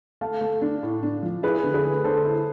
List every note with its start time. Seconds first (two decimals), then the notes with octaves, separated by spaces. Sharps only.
0.21 A3 F5 A5
0.41 A3
0.61 D4
0.83 A2
1.03 D4
1.23 F3
1.43 E4 G#4 B4
1.64 D3
1.74 G#4 B4
1.84 A3
2.04 D3 A4 C5
2.25 E4